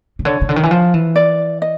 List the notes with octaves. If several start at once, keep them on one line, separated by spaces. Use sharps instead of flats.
C#3
D3 C#5
C#3
D3
D#3
E3
F3
E3
D5
D#5